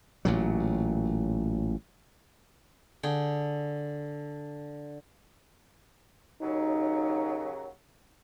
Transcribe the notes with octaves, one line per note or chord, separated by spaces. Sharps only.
A1 A#2 F#3
D3 G#4 G5
D#2 C#3 F#3 D#4